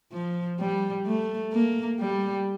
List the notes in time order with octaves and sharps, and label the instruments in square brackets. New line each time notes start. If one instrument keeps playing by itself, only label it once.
[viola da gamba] F3
G3
A3
A#3
G3